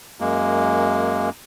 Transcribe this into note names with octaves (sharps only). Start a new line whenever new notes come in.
F#2 G#3 A#3